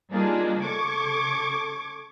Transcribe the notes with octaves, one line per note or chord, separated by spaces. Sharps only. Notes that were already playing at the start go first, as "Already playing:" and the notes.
G3 A#3 D4 D#4 F4 G#4
C#3 A4 C#6 D6 G#6